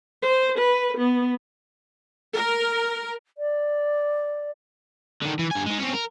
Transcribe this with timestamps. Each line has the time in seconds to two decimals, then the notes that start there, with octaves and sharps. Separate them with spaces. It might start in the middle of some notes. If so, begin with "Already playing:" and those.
0.23 C5
0.58 B4
0.98 B3
2.35 A#4
3.38 D5
5.22 D3 D#3
5.39 E3
5.51 G2 G#5
5.66 G#3 D#4
5.79 C4 C#4
5.93 A#4